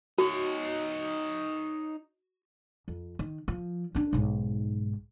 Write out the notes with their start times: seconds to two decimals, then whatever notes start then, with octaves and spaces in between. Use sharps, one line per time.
0.18 D#4 F#4 C#5
2.88 F2
3.19 D#3
3.48 F3
3.95 C#4 D4
4.13 B1 G#2